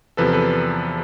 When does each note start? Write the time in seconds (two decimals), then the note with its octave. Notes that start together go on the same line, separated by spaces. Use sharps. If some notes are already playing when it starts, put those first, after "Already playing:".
0.17 E2 C3 F3 A4 B4
0.33 A4 B4